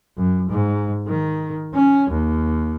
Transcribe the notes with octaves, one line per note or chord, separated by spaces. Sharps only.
F#2
G#2
D#3
C#4
D#2